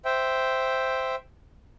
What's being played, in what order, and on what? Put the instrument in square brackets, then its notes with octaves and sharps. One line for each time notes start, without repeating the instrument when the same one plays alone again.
[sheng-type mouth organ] C5 E5 G5